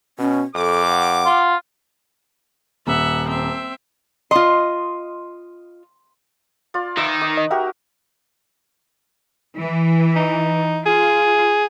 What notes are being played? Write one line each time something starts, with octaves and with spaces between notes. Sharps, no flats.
B2 C#4
F2 A4 D6
F#5
F4
D#1 E5 F#5
C4 E5
F4 D#5 C6
F4 D5
D#3 B4 D5 E5
D#4 D6
D#5
F#4 G4 A#4 E5 G5
E3
D#4
F4 G#4